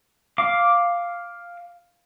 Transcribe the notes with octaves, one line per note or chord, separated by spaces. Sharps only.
F5 D6